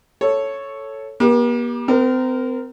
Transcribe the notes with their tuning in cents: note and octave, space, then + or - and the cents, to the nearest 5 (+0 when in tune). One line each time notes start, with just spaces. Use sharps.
A4 +0 C#5 +0
A#3 +45 G4 +5
C4 -35 A#4 +0